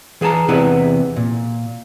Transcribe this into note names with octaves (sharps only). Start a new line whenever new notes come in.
E3 G#4 E5 A5 A#5
E2 C3 E4 B4 D#5 F#5
A#2